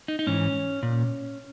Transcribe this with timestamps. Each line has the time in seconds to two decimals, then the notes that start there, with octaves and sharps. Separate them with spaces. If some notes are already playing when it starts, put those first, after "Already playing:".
0.08 D#4
0.19 D#4
0.27 G#2 E3 C#4
0.83 A#2